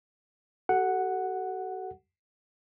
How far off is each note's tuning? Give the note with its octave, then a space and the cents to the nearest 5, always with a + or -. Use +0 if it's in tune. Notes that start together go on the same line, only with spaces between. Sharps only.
F#4 +45 A4 +0 F#5 +0